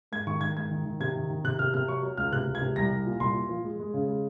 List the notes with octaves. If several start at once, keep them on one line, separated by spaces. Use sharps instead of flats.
G#2 G#6
D#3 C#6
D#3 G#6
G#2 G#6
D#3
D#3
C3 G#6
D#3
D#3
C3 F#6
C3 F6
C3 F6
F#3 C#6
F#3
C#2 F6
C3 F#6
C#2
G#6
C3
C2 A#6
C2
A#2
C2 C6
A#2
F3
G#3
G#3
C#3
G#3